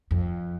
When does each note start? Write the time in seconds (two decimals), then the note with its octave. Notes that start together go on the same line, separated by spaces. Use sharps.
0.11 F2